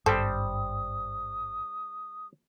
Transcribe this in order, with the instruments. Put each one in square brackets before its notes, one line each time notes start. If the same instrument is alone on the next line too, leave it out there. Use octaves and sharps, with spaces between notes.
[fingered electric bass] G#1 G2 [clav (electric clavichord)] G3 C4 C5 [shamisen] A4 [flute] D#6